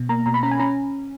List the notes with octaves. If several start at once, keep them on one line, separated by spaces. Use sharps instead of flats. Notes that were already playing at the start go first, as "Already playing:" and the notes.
Already playing: B2
A#3 A#5
B2 A#5
B5
C#4 A#5
G#5
C#4 A#5